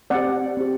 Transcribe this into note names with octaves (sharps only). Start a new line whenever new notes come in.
C4 G4 D5 F#5
C4 G4